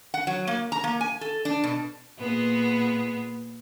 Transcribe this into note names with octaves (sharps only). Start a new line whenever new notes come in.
F#5
F#3
A#3
A#5
A#3
G#5
A4
D4
B2
A#2 B3 G#4